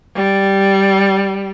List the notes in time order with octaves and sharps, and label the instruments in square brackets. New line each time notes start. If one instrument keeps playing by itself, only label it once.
[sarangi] G3